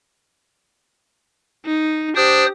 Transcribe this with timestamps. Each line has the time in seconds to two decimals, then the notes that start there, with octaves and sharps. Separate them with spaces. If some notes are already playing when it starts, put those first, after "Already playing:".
1.65 D#4
2.16 D4 G4 C5 D#6